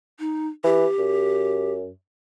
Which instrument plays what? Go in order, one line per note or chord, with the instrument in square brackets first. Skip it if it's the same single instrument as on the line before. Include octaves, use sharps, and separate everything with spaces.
[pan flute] D#4
[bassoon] E3 [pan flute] G4
[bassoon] F#2